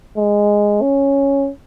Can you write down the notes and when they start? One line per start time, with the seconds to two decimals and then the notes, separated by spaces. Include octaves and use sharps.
0.17 G#3
0.82 C#4